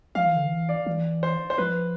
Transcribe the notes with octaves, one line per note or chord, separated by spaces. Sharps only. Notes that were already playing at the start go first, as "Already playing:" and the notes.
F3 F5
E3
D3
E3
D5
E3
C5
C5
F3 B4